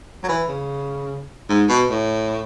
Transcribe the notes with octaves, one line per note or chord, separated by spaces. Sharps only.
F#3
E3
C#3
G#2
B2
A2